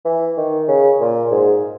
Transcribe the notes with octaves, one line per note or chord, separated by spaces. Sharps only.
E3
D#3
C#3
A#2
G#2